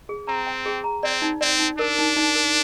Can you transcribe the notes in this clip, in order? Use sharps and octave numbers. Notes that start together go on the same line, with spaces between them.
G#4
C4 A#5
G5
G#4
A#5
C4 D5
D#4
C4 D5
D#4
D4 A#4
D#4
D#4
A#4